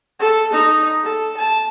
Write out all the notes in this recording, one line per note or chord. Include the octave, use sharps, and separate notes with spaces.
A4
D#4
A4
A5